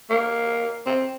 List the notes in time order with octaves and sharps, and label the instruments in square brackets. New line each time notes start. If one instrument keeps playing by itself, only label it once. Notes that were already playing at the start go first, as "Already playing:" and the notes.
[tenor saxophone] A#3
C4